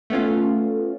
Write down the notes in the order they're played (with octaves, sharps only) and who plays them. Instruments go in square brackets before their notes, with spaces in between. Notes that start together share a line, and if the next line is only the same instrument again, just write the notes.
[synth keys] A3 B3 C#4 F4